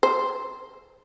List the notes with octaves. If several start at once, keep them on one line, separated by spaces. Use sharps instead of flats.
C5